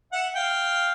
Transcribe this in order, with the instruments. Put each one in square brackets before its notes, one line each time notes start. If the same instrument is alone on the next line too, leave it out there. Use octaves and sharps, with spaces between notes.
[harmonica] E5 F#5
F5 G5